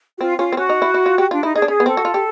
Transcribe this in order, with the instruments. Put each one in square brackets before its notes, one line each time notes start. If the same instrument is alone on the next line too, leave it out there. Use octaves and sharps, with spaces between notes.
[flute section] F#4
[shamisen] C4 [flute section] F4
[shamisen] C#4 [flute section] F4
[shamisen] C4
[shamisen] C#4 [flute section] F#4
[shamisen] D#4
E4
E4
F4
G4
[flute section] D4 [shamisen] F4
[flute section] D#4 [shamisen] E4
[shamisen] D#4 [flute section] G#4
[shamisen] D4
[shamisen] C#4 [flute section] G#4
[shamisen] B3
[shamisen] C4 [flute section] A4
[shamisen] F#4
F4
G4